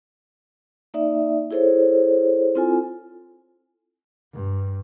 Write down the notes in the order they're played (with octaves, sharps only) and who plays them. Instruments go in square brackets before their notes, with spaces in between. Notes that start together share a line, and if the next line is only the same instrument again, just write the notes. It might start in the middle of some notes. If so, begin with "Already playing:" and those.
[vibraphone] A#3 D#4 D5 E5
E4 G#4 A4 C5 C#5
C4 E4 F4 A4 G#5
[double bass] G2